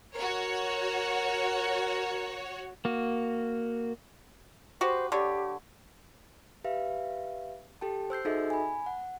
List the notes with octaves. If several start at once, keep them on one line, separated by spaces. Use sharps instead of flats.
F#4 A#4 C#5
A#3 F#4
F#4 G4 B4 C5
D3 G4 C#5
G4 B4 E5 F5
G4 A4 G5 A5
C5 E6 G6 C7
D#4 F#4 G#4 A4 D#5 E5
G#5 B5
F#5